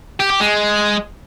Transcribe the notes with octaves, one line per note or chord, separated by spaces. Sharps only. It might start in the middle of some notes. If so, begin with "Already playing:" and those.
G4
G4
G#3